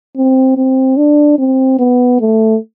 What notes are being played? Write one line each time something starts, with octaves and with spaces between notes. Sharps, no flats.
C4
C4
D4
C4
B3
A3